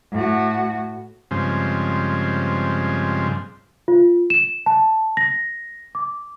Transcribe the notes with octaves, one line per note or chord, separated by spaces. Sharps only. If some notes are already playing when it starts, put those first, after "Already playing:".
A2 F#4
G2 C#3 F3 G#3 C4
F4
E7
A5
A#6
D6